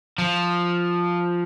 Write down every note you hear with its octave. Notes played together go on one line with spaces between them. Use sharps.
F3